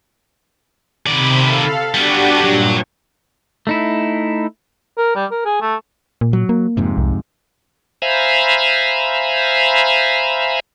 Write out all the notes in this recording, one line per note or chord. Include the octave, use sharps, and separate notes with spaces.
C3 D#3 D5 B5
A4 F5
G3 B3 D4 F#4 G4
G2 A#2 F#3
A3 D#4 E4
A#4
G3
A#4
G#4
A3
A#2
F#3
A#3
F2 G#2 C3
C2
C5 E5 F5 G#5 A#5 B5